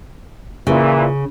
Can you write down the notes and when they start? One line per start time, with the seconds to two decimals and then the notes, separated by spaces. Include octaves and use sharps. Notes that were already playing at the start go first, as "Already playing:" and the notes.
0.67 A#2 C#3 E3